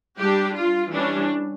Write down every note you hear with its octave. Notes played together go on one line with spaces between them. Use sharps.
G3 D4 G4
F4
E3 G3 C#4 D4